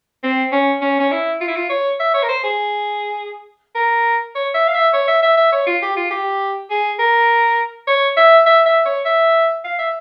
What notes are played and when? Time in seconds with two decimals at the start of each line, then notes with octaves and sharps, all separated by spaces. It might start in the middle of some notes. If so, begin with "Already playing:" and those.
0.23 C4
0.52 C#4
0.82 C#4
1.00 C#4
1.11 E4
1.41 F4
1.48 E4
1.56 F4
1.70 C#5
2.00 E5
2.14 C#5
2.23 A#4
2.29 C5
2.43 G#4
3.75 A#4
4.35 C#5
4.54 E5
4.68 F5
4.74 E5
4.93 C#5
5.08 E5
5.23 E5
5.37 E5
5.52 C#5
5.67 F4
5.82 G4
5.96 F4
6.11 G4
6.70 G#4
6.99 A#4
7.88 C#5
8.17 E5
8.46 E5
8.66 E5
8.86 C#5
9.05 E5
9.64 F5
9.79 E5